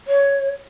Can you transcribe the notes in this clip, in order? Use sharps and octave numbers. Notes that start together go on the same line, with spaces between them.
C#5